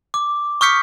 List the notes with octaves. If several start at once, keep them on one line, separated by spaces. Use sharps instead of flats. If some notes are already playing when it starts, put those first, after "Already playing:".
D6
C#6 D#6 F6 G6 B6 C#7